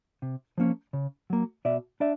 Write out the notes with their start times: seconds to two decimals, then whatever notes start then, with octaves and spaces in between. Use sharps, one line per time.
0.22 C3
0.58 F3 A#3 C#4
0.93 C#3
1.30 F#3 A#3
1.65 B2 D5 E5
2.00 D4 D5 E5